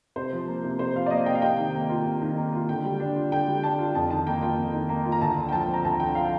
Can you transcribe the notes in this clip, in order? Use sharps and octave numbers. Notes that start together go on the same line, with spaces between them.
C3 C5
F3
A#3
C3
C3 C5
F3 F5
D5
A#3 D#5
C3 G5
F5
C3 G5
D#3
A#3
F4
C3
D#3
A#3
F4
D3 G5
G3
D4
F4
D3 G5
G3
D4 A5
F4
F2 A5
D#3 A5
A#3 G5
F4 G5
F2
D#3
A#3
F4
A#5
D2 A5
D3
G5
F3 A5
C4
A#5
D2 A5
D3 G5
F3 F5